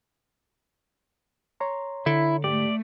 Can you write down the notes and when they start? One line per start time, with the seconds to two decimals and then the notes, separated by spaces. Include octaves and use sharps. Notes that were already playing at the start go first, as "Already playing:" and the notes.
1.60 C#5 A#5 C6
2.06 D3 E4
2.44 G#2 A3 G4 D5 D6